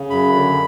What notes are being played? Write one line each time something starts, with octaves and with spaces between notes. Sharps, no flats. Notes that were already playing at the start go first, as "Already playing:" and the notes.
Already playing: C#3
F#2 B5
D3